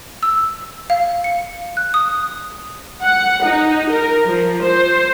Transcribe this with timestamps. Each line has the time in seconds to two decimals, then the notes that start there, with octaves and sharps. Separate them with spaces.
0.23 E6
0.90 F5
1.24 C#7
1.77 F#6
1.94 D#6
3.02 F#5
3.44 D#4
3.90 A#4
4.27 F3
4.63 C5